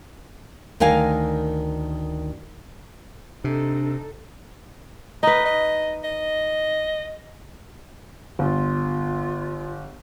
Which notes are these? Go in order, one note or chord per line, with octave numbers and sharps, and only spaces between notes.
D2 D#3 A#4 F5 G#5
C3 D4 D#4 A4
D#4 B4 D#5
D#5
D#5
G1 F4